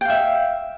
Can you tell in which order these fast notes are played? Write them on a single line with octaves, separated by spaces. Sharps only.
G5 F5 E5